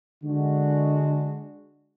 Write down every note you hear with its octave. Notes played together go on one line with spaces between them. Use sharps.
D3 G#3 D4 F#4